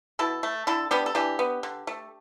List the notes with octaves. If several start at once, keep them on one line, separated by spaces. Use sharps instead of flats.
B2 E4 A4
A3
D3 E4 A4
G3 B3 D4 G4
A4
E3 D4 G4
B3
D3
A3